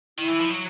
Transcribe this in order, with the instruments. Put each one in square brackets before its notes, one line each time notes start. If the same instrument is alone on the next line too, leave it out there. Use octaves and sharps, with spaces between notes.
[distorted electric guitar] D#3 [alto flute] E4
[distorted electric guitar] E3
F3
F#3